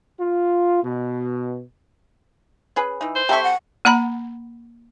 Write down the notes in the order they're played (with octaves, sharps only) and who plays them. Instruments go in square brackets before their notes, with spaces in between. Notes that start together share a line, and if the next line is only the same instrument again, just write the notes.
[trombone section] F4
B2
[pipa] C#4 G#4 B4
E3 D#4
[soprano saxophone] C5
[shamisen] G3 C4 A4 [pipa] G4 A#5 C#6 [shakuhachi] E5
[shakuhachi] F#5
[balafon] A#3 F#5 A#5 B5